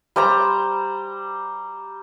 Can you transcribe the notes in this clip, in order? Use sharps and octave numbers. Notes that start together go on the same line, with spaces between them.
G3 C5 A#5